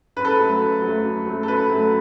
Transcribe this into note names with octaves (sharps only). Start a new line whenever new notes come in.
F#2 B4
A4
B4
F#3 A3
F#2
F#3 A3
F#2
F#3 A3
A4
F#2 B4
F#3 A3